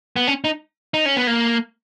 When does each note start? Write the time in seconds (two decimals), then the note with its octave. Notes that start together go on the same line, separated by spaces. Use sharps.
0.16 B3
0.27 C#4
0.44 D#4
0.94 D#4
1.06 C#4
1.17 B3
1.27 A#3